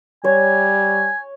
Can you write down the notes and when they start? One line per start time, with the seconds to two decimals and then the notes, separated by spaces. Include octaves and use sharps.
0.24 G3 C#5 G#5